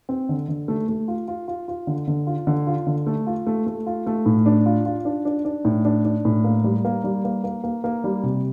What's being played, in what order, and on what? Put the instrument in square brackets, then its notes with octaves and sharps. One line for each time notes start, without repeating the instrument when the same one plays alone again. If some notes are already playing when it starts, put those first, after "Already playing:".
[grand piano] C4
D3
D3
A3
A3
F4
F4
F4
F4
D3
D3
F4
D3
F4
D3
A3
F4
A3
A3
F4
A3
A2
D4
F4
F4
D4
D4
D4
A2
D4
D4
A2
A#3
G3
A#3
G3
A#3
A#3
A#3
A#3
G3
C3